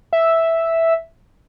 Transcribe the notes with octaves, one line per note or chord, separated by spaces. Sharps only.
E5